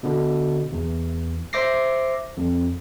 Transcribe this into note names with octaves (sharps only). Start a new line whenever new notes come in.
B2 D3
E2
C5 E5 D6 A#6 C7
F2